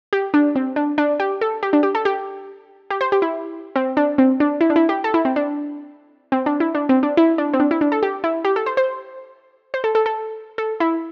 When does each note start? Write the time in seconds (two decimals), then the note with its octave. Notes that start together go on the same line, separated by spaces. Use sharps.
0.13 G4
0.34 D4
0.56 C4
0.76 D4
0.98 D4
1.20 G4
1.41 A4
1.63 G4
1.73 D4
1.83 G4
1.95 A4
2.05 G4
2.90 G4
3.01 C5
3.12 G4
3.22 E4
3.76 C4
3.97 D4
4.18 C4
4.40 D4
4.61 E4
4.70 D4
4.76 E4
4.89 G4
5.04 A4
5.14 E4
5.25 C4
5.36 D4
6.32 C4
6.46 D4
6.60 E4
6.75 D4
6.89 C4
7.03 D4
7.17 E4
7.38 D4
7.53 C4
7.60 D4
7.71 E4
7.81 D4
7.92 A4
8.03 G4
8.24 E4
8.45 G4
8.56 A4
8.66 C5
8.77 C5
9.74 C5
9.84 A4
9.95 A4
10.06 A4
10.58 A4
10.80 E4